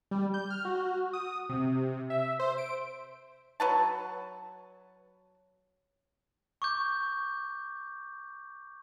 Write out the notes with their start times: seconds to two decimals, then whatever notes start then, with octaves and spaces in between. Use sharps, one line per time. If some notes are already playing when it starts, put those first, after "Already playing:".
0.11 G3
0.34 G6
0.50 F6
0.65 F#4
1.13 D#6
1.49 C3
2.10 E5
2.39 C5
2.58 D7
3.60 F#3 B4 A5
6.62 C#6 D6 G6